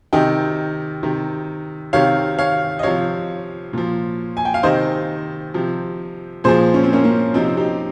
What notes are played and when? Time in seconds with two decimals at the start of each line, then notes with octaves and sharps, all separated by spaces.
0.13 C3 D#3 D#5 G5
1.03 C3 D#3
1.93 C3 D#3 C#5 F5
2.38 C#5 F5
2.79 D#5
2.83 C3 F3 C#5 F5
3.73 A#2 F3
4.37 G#5
4.45 G5
4.54 F5
4.63 C3 D#3 C5 D#5
5.54 C3 F3
6.44 A#2 F3 G#4 C5
6.74 C#4
6.83 C4
6.93 A#3 C#4
7.04 A#3 C#4
7.34 C3 F3 C4 D#4
7.57 D#4 G4